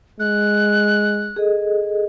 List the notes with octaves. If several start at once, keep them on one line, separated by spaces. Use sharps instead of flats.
G#3 F#6
G#4 A4 D#5